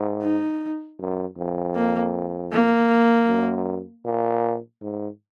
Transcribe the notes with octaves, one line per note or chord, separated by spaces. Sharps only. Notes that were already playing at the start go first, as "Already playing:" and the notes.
Already playing: G#2
D#4
F#2
F2
A#3
A#3
F#2
A#2
G#2